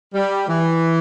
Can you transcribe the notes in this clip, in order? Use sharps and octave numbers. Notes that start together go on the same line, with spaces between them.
G3
E3